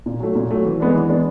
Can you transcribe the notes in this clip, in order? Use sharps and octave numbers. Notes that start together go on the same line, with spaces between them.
A#2
F#3 A3
A#2
F#3 A3
E3
G#3 B3 D4
E3
G#3 B3 D4